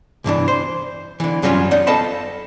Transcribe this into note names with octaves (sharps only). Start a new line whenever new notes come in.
C2 G2 E3 D4
C5
D3 E3
F#2 F#3 G3 C#4 F4
D#4 D5 F#5
A4 D#5 F5 A5 B5